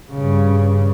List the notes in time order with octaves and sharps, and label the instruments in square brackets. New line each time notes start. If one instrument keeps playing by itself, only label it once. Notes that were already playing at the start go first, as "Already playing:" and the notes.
[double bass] G2 C#3